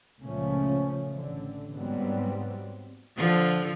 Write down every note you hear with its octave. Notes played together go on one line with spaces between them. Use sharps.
C#2 A#2 C#3 F3 A3 C#4
A1 D3
G#2 F#3 G3 B3 C4
D3 F3